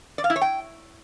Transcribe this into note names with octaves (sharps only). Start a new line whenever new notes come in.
D5
F5
E4
C#5
G5